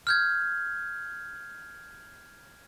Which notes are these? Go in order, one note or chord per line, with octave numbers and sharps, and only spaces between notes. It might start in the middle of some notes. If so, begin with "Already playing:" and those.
F6 G6 G#6